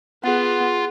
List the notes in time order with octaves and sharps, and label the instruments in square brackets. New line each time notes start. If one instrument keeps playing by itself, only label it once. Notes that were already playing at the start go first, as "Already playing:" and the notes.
[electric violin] B3 [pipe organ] F4 [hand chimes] G#4 F#5